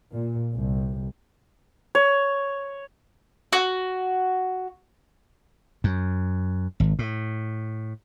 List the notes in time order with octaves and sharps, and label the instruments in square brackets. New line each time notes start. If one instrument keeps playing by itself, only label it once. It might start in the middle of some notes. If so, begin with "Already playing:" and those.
[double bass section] A#2
C2
[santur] C#5
[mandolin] F#4
[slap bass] F#2
G#1
A2